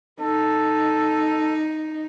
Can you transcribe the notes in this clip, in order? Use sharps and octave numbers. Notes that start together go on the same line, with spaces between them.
D#4 A4